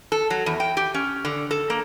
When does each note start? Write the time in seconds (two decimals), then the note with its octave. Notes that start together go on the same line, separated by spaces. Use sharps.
0.12 A4
0.30 F#3
0.46 E2
0.60 G5
0.77 G4
0.94 C#4
1.25 D3
1.51 A4
1.70 A#3